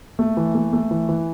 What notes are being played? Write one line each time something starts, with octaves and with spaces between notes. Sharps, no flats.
A3
E3
A3
A3
E3
E3